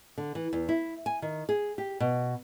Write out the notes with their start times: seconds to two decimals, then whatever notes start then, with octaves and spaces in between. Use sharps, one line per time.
0.18 D3
0.35 E3
0.53 E2
0.69 E4
1.06 G#5
1.22 D#3
1.49 G#4
1.78 G4
2.00 B2